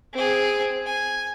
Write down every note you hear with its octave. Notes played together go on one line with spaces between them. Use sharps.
C4 G#4
G#5